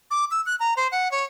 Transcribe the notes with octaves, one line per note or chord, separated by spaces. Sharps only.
D6
E6
F#6
A#5
C5
F#5
C#5